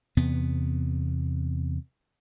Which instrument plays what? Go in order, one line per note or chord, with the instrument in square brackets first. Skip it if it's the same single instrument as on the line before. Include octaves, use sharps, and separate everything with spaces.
[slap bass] E2 C3 B3